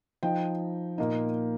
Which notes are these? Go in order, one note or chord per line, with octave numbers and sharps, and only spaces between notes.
F3 D#4 G5
A#2 A#3 D#4